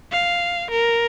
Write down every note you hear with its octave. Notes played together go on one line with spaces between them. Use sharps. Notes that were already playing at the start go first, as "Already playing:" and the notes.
F5
A#4